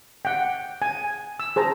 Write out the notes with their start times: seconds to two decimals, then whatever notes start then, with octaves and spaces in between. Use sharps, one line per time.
0.25 F#5 G5
0.82 G#5
1.40 E6
1.56 G#4 C5 A5 A#5